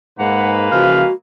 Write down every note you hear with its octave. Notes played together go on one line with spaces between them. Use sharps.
G#2 G#3 A#3 B4 F#5
C#3 E3 F3 F#4 F5